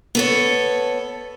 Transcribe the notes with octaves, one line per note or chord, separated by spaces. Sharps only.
B3 A4 C#5